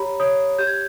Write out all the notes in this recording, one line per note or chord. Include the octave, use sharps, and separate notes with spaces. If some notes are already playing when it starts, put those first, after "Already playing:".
Already playing: G4 C#5 A#5 B5
C#5 D#6
G4 G6
G#6